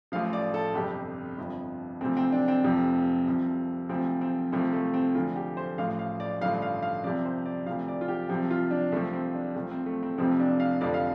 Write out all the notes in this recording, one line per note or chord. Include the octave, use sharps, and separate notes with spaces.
A1 A2 F3 F5
D5
A4
G1 F2 C3 G4
G1 F2 F3
D2 C3 F3 C4
C4
D4
C4
F1 F2 C3 F3
C2 C3 F3
D2 C3 F3 C4
C4
C2 C3 F3 A3
A3
C4
D2 D3 F3 F4
G4
C5
A1 A2 F3 F5
F5
D5
A1 G2 D3 F3 F5
F5
F5
C2 C3 F3 D5
C5
D5
D2 C3 F3 F5
D5
F4
G4
C2 C3 F3 G4
F4
D4
C2 C3 F3 A3
C4
D4
C2 C3 F3 A3
C4
A3
C4
F1 F2 C3 F3 C4
D4
F5
F1 F2 D3 F3 D5
F5